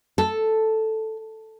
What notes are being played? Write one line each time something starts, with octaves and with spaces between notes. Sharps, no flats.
A4